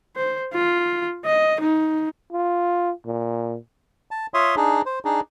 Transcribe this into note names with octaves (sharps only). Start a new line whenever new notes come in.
C5
F4
D#5
D#4
F4
A#2
A5
F4 C#5 E5 C6 D#6
D4 D#4 G#4
C5
D4 D#4 G#4